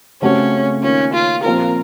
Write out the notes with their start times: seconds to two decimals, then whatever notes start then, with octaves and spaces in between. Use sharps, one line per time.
0.22 C#3 A3 C4 C#4 F#4
0.83 D#3 A#3 C#4 F4
1.14 F4
1.44 A#2 F3 C4 F4 A#4